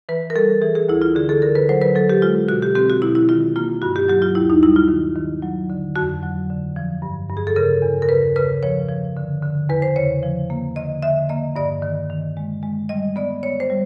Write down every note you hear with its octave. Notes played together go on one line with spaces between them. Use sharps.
E3 B4
A#4
G3 A4
E3 G#4
G#4
D2 E4
F4
D3 G#4
A4
D3 A#4
B4
F#3 C5
B4
F#3 A4
G4
G#3 F4
B2 F#4
G4
C4 G4
F#4
B2 E4
E4
D#3 F4
A#3 F4
G2 F#4
G4
F#3 G4
F4
D#2 E4
D#4
G3 E4
F4
D#3
D#3
F#3
D3
F2 F#4
F#3
D3
F3
G2
G2
G#4
A4
C#3 A#4
E2
A#4
C#3 B4
C#3 B4
F3 C#5
F3
D3
D3
E2 B4
C5
C#3 C#5
F3
A#3
D3 D#5
D3 E5
A#3 D#5
G2 D5
D#3
D#3
G#3
G#3
G3 D#5
B3 D5
B3 C#5
C5
G3